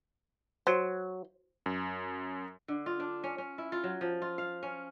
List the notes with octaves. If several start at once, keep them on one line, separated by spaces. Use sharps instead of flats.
F#3 C5
F#2
D3
F4
D4
C#4
C#4
E4
F4
F#3
F3
F4
F5
C#4